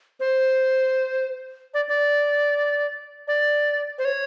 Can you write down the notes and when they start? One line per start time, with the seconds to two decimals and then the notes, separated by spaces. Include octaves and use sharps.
0.20 C5
1.74 D5
1.88 D5
3.28 D5
3.98 C5
4.05 C#5